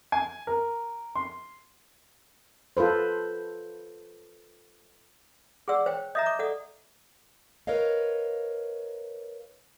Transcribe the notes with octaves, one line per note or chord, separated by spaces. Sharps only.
G#5
A#4
C6
F4 A4 B4 C5
G#4 D5 F#5 C6 D6 E6
C5 C#5 G5
D#5 E5 A#5 D#6 G6
D6
A4 D5 F#5 D#6
A#4 B4 C#5 D#5 F5